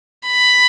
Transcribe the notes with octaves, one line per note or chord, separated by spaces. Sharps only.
B5